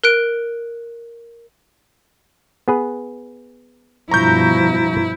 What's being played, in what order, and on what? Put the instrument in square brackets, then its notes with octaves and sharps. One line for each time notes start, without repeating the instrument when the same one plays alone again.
[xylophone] A#4 F#6 D7
[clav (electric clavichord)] B3 G#4 B4
[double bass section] G2 B2 F3 [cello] E4 [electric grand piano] A#5 C#6 G6